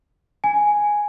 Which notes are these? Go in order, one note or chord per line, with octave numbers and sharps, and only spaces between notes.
G#5